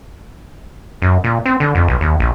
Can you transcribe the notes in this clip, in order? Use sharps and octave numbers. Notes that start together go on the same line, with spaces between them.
F#2
A#2
C4
D3
F2
B1
D#2
A#1